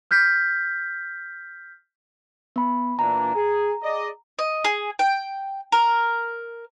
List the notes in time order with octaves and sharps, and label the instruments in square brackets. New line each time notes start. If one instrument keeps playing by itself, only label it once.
[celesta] F6 G6 B6
[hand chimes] B3 B5
[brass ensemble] A#2 E3 D4 [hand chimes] A#5
[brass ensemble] G#4
G#4 D5 D#5
[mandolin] D#5
G#4
G5
A#4